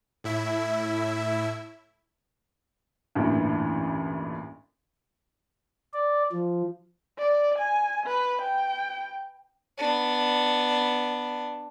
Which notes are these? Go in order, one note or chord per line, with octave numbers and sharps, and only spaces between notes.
A2 E4 E5
A1 D2 G2 A#2 E3
D5
F3
D5
G#5
B4
G5
B3 D4